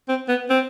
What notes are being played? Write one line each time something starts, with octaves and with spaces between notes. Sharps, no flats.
C4
B3
C4